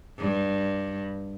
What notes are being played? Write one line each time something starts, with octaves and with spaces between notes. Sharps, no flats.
G2